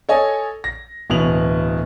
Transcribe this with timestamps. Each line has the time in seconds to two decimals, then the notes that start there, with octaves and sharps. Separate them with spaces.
0.09 A4 C#5 D#5 G#5
0.64 A#6
1.10 D1 B2 E3 F7 F#7